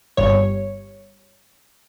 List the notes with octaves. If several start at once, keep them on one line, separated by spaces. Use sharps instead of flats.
G1 G2 C#5